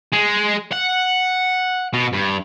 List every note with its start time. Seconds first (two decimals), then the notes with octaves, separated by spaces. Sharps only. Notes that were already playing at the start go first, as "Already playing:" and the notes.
0.13 G#3
0.73 F#5
1.93 B2
2.13 G2